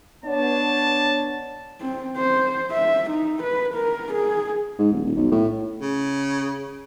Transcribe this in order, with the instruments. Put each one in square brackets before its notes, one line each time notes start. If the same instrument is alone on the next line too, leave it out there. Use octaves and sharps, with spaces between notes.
[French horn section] B3 D4 C#5 [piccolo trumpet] A5
[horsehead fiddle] C4
C5
E5
D#4
B4
A#4
G#4
[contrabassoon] G#2
D#1
D#1
B1
A2
[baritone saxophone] C#3